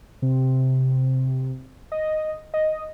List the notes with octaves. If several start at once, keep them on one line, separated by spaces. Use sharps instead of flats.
C3
D#5
D#5